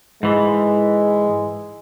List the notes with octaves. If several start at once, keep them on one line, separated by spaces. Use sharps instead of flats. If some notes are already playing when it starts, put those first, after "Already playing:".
G#2 E3 G#3